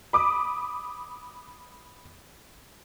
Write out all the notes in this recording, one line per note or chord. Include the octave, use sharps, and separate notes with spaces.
B5 D6 D#6